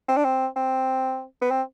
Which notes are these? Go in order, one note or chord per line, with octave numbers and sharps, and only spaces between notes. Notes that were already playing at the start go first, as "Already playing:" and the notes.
C4
D4
C4
C4
B3
C4